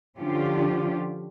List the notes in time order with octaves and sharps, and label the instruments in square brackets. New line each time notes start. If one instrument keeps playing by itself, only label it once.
[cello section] D3 F3 C#4 D4 F4 G4